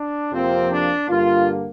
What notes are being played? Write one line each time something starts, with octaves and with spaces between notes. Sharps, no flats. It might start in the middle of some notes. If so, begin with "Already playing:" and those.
Already playing: D4
F2 C3 F3 A#3 C4
D4
G2 D3 A#3 F4